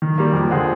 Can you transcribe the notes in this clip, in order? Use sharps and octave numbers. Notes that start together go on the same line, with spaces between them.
D#3
G3 A#3
F2
D3 F3 G#3 C4